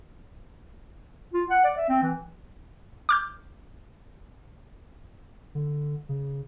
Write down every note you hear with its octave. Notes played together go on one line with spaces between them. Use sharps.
F4
F#5
D5
E5
C4
E3
D6 F6 G6
D3
C#3